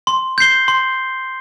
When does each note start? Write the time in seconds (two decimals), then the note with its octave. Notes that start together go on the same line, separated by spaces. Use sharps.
0.07 C6
0.38 G6 C7 G7
0.68 C6